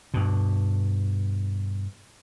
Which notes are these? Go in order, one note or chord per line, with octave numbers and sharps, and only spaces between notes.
G2 B2